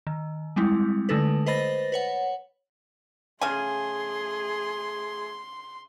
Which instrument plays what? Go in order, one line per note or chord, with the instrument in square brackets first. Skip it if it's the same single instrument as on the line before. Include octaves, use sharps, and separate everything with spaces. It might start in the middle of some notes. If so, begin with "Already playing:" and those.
[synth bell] D#3
G3 G#3 C4 E4
D3 G#3 A3 D#4 A4 B4
B4 C5 D#5 B5 A6 A#6
B4 C#5 F#5
[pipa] C#3 G#5 [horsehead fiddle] A3 G#4 [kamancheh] C6